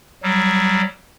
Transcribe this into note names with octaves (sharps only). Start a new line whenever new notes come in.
F#3 G3